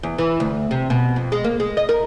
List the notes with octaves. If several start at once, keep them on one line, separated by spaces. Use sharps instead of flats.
E2
E3
D2
C3
B2
F2
G#3
A#3
G#3
D#5
A#4